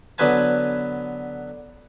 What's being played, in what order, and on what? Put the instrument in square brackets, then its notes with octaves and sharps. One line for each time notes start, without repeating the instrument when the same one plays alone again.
[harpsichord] D3 F#3 B3 B4 G#5 A5